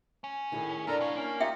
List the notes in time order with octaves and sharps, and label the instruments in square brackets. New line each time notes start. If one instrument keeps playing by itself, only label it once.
[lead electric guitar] C#4
[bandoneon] A2 [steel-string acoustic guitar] D#3 E4 G#4
[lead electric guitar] F#2 [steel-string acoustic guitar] D4 E4 [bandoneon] A4 A#4 A#5
[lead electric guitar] C3 C#5 [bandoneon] F5
[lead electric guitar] A#3 [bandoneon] C#4
[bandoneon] D#4 F4 G4 [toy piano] E5 G5